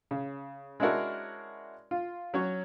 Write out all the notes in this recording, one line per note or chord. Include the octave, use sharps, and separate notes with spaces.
C#3
G#3 C#4 D4 E4 F#4 A#4
F4
F#3 C#4 F#4 C#5